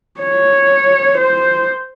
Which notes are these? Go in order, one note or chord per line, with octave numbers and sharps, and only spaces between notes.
C#5
C5